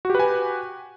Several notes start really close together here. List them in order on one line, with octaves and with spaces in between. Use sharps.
F#4 G4 B4 G#5